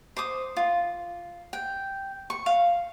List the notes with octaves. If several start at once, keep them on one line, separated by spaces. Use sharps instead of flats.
C5 D6 D#6
F4
G5
C#6
F5